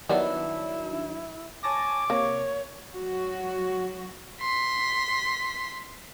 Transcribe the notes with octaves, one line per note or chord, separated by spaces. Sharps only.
D#3 F#3 G3 B3 D4 E4 B4
C#5 G#5 A5 D6 A#6
C3 A#3 C#5
F#3 F#4
C6 B6